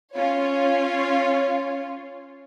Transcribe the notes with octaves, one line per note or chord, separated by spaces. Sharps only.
C#4 F4 C#5